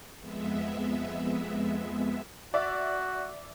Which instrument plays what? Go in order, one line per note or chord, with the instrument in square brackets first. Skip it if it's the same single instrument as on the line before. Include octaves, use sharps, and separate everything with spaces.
[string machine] F2 G#3 B3 E5
[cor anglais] F#4 [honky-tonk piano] D5 E5